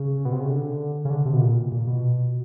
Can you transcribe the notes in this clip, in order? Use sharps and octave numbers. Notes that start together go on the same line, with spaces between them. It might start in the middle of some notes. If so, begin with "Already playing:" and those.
Already playing: C#3
B2
C3
C#3
D3
C#3
D3
C3
B2
A#2
A#2
B2